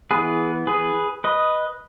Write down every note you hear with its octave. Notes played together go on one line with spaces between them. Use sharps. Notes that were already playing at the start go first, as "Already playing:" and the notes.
E3 B3 G#4 B4
G#4 B4
B4 D#5